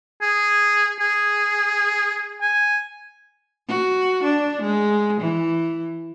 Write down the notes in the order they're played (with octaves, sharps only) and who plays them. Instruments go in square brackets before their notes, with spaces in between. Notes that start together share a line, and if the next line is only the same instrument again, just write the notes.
[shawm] G#4
G#4
G#5
[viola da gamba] F#4
D4
G#3
E3